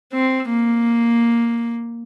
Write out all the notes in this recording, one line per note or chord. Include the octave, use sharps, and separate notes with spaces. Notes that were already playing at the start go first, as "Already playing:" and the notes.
C4
A#3